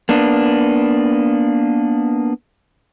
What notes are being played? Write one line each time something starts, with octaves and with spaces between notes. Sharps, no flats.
A#3 B3 D4